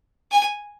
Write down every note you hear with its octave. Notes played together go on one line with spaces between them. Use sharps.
G#5